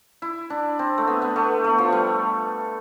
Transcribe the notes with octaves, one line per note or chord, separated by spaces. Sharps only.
E4
D4
C4
A3
B3
B3
A3
A3
F3
G3